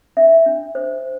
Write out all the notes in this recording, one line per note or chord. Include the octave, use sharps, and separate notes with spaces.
D4 E5
D4
C5